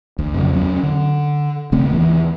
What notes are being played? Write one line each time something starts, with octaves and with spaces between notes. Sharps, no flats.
D2
F2 C#3 E3 F#3
E2 F#3 C#4
D3
D#1 C#3 A3 C4
D#2 E3